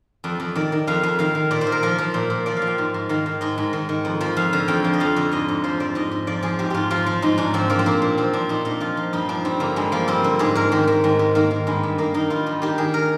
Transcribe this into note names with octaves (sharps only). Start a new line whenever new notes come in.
F2 D5
F2
D#3 D5
D#3
F2 F5
F2
D#3 F5
D#3
A#2 D5
C5
A#2
A#4
F3 A#4
F3
A#2
A#2
F3 D5
F5
F3
G5
G#2
G#2
D#3 F5
D#3
G#2 D#5
G#2
D#3
D#3
F2
F3
F2 F5
D3
F2 G5
F3
D#5
F2 F5
D3
G#2 D#5
G#2
F3 C5
F3 D5
G#2 D#5
G#2
F3 D5
F3 G#4
G#2 G4
G#2 F4 G4
F3 F4
F3
G#2 D#4
G#2 D4
F3 C4
F3 A#3
C4
A#2 A#3
A#2
F3 C4
F3 D4
A#2 D#4
A#2 D#4
F3 F4
F3
G2 D#4
F3 D4
G2 C4
D3 A#3
G2 G#3
F3 A#3
G2 C4
D3
G#2 G#4
G#2 A#4
D#3 G4
D#3
G#2
G#2
D#3 A#3
D#3
G2 G#3
G2
D#3 A#3
D#3 D#4
G2 F4
G2
D#3 G4
D#3 G#4
A#4